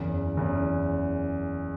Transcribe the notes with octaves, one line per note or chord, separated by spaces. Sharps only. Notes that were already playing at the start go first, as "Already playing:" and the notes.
Already playing: F#1 E2 C#3
F#1 E2 C#3